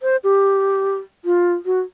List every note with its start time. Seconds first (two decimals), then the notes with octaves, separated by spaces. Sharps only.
0.02 C5
0.24 G4
1.25 F4
1.66 F#4